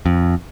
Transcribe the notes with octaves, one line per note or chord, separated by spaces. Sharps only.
F2